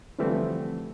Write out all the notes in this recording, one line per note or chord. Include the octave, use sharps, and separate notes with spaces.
D3 E3 F3 G3 A3 C4